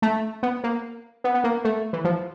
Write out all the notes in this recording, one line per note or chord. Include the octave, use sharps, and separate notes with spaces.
A3
B3
A#3
B3
B3
A#3
A3
E3
F3